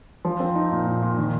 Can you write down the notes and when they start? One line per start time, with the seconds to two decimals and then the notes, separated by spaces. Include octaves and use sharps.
0.25 F3
0.40 C4
0.55 D#4
0.72 A#2
0.87 D#4
1.02 A#2
1.18 D#3